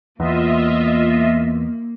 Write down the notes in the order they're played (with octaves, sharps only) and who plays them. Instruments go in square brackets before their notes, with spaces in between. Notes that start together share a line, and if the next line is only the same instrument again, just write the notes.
[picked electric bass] E2 [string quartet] A#3 [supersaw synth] F4 D#5 E5